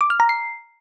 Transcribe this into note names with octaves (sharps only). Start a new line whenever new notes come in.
D6
F6
A#5
C7